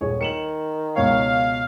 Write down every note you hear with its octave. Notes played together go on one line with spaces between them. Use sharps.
D#1 G#4 C#5
D#3 C#7 E7 F#7
C#2 B2 C#5 F5